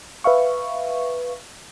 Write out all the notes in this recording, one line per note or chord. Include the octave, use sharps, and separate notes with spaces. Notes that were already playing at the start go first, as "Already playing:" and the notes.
B4 E5 F5 C#6